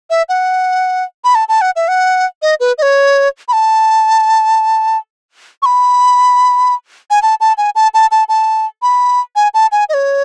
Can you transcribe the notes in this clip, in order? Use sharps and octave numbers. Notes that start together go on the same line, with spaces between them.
E5
F#5
B5
A5
A5
F#5
E5
F#5
D#5
B4
D#5
C#5
B5
A5
C#6
B5
G#5
A5
A5
G#5
A5
A5
A5
A5
B5
G#5
A5
G#5
D#5
C#5